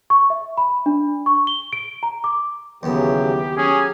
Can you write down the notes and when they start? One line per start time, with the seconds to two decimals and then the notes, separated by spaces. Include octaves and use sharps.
0.10 C#6
0.30 E5
0.57 B5
0.86 D4
1.26 C#6
1.47 G7
1.73 D7
2.03 A#5
2.24 D6
2.83 D#2 C#3 E3 F#3 B3 G4
3.57 F#3 C#4 G4 G#4